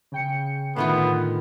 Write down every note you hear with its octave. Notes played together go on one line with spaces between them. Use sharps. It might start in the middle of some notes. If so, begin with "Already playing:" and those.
C#3 G5 C#7
A2 D3 D#3 A3 B3 F4